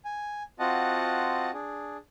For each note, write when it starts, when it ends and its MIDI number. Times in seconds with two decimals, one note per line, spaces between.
0.05 0.43 80
0.59 1.51 60
0.59 1.51 65
0.59 1.51 66
0.59 1.51 75
0.59 1.51 78
0.59 1.51 81
1.53 1.97 62
1.53 1.97 68